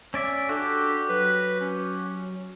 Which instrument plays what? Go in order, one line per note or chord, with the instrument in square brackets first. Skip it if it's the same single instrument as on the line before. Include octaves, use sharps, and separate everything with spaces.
[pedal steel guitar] C#4 D5 E5
[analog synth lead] D4 [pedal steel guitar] F#4 G4 [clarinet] A4
[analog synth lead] F#3 [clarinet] B4
[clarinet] C#4